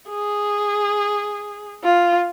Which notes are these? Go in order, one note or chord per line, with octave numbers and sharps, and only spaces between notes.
G#4
F4